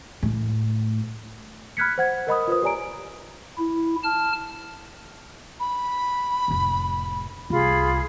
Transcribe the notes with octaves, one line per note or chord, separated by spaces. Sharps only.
A2
B5 F6 F#6 G#6 B6 C#7
C5 F#5 G#6
A#4 D#5 B5 D#6
F4 B4 C5 D#6
G4 C#5 D5 G#5 A#5 D7
E4
A5 F6
B5
F1 A2
C2 F4 G#4 B5